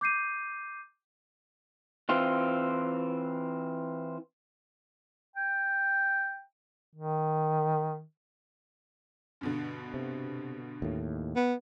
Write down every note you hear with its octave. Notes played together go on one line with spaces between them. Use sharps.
D6 G6 C7 D#7
E3 C4 F4
G5
D#3
G2 B2 D3
C3
D#2 A2
B3